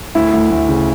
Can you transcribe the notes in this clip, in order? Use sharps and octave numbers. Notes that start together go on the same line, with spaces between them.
D2 E4
D2
D2
C#3